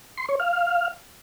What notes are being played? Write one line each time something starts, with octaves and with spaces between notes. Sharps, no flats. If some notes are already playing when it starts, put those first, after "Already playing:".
C6
C#5
F5